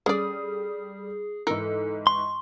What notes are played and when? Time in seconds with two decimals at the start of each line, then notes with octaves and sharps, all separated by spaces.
0.06 G3 C#4 G#4 A4 D5 D#6
1.47 G#2 E3 A4 A#4
2.07 C6 C#6